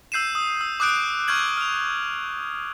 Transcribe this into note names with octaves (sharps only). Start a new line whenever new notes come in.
E6 G6 C7 D#7 E7
D#6
E6
D6 D#6 F#6 G6 D7
C#6 F6 G6 G#6 F#7
F6 F7